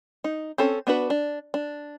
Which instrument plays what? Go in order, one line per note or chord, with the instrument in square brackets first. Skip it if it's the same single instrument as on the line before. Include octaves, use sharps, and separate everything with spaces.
[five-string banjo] D#4
C4 C#4 A4
B3 D4 F#4 B4
D4
D4